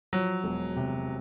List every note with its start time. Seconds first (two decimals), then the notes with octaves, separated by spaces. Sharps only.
0.13 F3 F#3
0.44 E1
0.76 C3